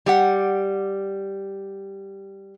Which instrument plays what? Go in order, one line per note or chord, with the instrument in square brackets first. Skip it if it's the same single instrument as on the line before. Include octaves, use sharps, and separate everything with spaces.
[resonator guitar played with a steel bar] G3 G4 F#5